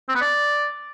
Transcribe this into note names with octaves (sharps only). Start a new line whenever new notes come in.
C4
B3
D5